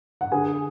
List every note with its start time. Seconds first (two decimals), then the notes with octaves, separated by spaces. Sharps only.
0.21 F#5
0.32 D3 G#4 G#5